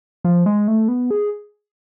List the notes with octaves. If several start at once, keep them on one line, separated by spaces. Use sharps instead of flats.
F3
G#3
A3
B3
G#4